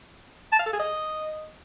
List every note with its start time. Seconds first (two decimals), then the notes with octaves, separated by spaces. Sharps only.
0.52 A5
0.59 F5
0.66 A4
0.73 G#4
0.80 D#5